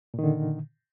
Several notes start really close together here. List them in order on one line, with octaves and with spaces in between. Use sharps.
A#2 D#3 D3